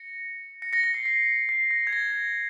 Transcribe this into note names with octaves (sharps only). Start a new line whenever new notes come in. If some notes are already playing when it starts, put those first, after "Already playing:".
Already playing: A#6 C#7
A#6 C#7
A#6 C#7
A#6 C#7
C7
C7
C7
A#6
G#6
A#6